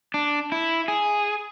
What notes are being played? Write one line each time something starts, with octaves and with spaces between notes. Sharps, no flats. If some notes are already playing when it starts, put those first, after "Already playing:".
D4
E4
G#4